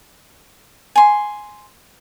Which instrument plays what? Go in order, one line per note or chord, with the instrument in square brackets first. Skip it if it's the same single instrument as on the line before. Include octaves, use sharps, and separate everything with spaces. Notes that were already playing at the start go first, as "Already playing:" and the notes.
[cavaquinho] G#5 C6